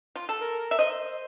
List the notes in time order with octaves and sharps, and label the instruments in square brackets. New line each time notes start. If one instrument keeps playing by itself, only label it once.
[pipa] F4
A4
[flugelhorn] A#4
[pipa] E5
[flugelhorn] C5 [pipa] D#5